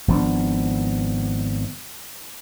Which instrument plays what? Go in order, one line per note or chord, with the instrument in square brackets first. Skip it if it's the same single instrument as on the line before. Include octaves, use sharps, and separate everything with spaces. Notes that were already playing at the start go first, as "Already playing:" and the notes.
[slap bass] G#1 F3 B3 D4